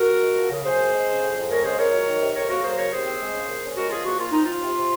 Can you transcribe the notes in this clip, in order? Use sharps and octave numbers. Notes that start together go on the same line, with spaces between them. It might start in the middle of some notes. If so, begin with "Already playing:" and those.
Already playing: F#4 A#4
C#2
G#3
F3
C#3
F#2 G#4 C5
C4
G#3
C#3
F2
F2
G#3 A#4 C#5
C#3 G#4 C5
C#2 A#4 C#5
F#3
D#3
C3
F2 A#4 C#5
A#3 F#4 A#4
F#3 G#4 C5
C#3 A#4 C#5
D#2 G#4 C5
C4
G#3
C#3
A#2
C#4
G#3 F#4 A#4
F3 F4 G#4
A#2 F#4
A#2 F4
C4 D#4
F3 F4
C3
C3